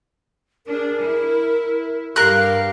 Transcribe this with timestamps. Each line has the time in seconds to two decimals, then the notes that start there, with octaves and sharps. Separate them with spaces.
0.66 D4 G#4 A#4
1.01 E4
2.16 G2 G4 A#4 F5 F#6